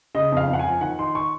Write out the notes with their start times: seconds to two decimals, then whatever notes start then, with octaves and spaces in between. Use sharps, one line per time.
0.15 C#3 D#5
0.32 F2 F5
0.48 F2
0.53 F#5
0.59 G#5
0.66 F3
0.81 D#3 F#5
0.99 D#4 C6
1.15 C#6